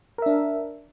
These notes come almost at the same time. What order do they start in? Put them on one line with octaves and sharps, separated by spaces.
A#4 E5 D4